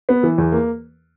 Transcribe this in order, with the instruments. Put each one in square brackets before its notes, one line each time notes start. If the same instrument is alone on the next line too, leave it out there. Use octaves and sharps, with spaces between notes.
[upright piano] B3
E3
E2
A#3